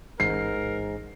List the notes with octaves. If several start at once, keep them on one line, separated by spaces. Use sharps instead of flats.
A1 G#2 A#4 C7